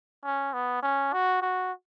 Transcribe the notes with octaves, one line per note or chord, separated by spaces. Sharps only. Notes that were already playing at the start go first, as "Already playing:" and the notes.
C#4
B3
C#4
F#4
F#4